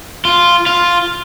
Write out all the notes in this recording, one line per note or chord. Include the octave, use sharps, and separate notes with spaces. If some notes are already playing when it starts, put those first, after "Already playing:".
F4
F4